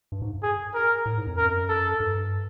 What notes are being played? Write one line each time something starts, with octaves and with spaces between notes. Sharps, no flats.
G2
G#2
G#4
A#4
A2
G#2
F2
F#2 A#4
A4
G2